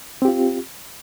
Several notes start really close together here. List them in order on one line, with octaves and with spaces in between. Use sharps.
C4 G4 F4